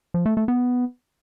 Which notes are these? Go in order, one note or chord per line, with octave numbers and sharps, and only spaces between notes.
F3
A3
A3
B3